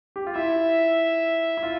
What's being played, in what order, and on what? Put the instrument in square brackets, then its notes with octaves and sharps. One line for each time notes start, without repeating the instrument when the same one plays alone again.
[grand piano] G4
F4
[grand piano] E4 [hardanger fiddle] E5
[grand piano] E4
F4